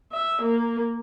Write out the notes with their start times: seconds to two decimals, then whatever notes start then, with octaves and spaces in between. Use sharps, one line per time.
0.12 E5
0.42 A#3